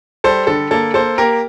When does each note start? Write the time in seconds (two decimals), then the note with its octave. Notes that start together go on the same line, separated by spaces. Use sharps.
0.24 G3 A4 C5
0.47 D3 A4
0.71 A#3 A4
0.94 A#3 A4 C5
1.18 A#3 G4 A#4